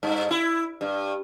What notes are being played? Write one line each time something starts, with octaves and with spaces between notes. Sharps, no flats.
G2
E4
G2